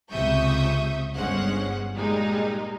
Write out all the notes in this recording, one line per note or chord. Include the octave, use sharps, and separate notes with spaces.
C#2 C3 E5 C#6 D#6 G6
G1 G2 G#3 C#4 C5 F#5
A#2 G3 G#3 D#4